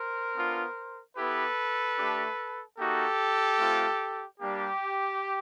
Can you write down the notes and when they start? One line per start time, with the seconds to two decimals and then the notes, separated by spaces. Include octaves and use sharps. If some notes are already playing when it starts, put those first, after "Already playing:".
Already playing: A#4 C5
0.35 B3 D4 F4
1.17 B3 E4 G4 A4 B4
1.98 A3 D4 G4
2.78 A#3 D#4 F#4 G4 A4
3.59 A3 C4 F4
4.40 G3 A#3 D4 G4